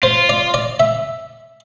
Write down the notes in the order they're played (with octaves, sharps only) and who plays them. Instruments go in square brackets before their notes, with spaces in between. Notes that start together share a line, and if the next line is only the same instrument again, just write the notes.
[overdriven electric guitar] F4 [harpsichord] C5
[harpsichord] D5
D5
E5